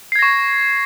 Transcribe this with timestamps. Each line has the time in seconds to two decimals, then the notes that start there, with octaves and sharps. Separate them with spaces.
0.12 C7
0.15 G#6
0.19 A#6
0.22 C#6